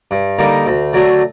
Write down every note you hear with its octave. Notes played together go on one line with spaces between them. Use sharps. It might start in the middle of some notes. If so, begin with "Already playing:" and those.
G2
D3 G3 A#3 D#4
D2
D3 F#3 A3 D4